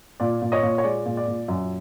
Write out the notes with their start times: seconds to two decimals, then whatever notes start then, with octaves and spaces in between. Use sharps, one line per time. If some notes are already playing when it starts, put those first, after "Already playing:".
0.20 A#2 D5
0.42 A#2
0.52 C#5 D#5
0.63 A#2
0.78 C#5
0.84 G#3 D5
1.06 A#2
1.17 D5
1.28 A#2
1.48 F#2